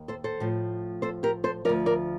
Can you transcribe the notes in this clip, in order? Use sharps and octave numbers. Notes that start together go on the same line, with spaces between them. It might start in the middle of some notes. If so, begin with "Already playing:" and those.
Already playing: D#2 D#3
A4 C5
A4 C5
A2 F3
A4 C5
G4 A#4
A4 C5
D2 C3 F3 A#4 D5
A#4 D5